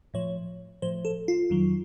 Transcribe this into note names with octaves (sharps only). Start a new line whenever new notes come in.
A2 F3 C#5
A2 F3 C5
A4
F4
F2 D#3 F#3